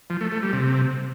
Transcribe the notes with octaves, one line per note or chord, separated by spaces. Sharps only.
F3
A3
A3
G3
C3